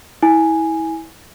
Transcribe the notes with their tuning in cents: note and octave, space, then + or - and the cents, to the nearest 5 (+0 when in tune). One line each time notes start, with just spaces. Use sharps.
E4 -25 G#5 +0